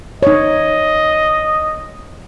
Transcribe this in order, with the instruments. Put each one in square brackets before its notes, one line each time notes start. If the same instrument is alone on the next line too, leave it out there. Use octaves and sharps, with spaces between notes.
[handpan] D#4 C#5 [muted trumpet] D#5